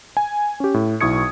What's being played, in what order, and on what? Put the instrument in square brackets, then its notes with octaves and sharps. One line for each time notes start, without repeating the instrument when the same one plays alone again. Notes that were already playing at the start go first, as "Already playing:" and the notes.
[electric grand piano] G#5
C#4 G4
A2
B1 E4 C#6 D#6 G#6 C#7